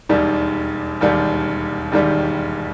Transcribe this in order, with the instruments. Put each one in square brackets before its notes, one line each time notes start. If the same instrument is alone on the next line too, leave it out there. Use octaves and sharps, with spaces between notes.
[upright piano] E1 D#2 D#3 G3
E1 D#2 D#3 G3
E1 D#2 D#3 G3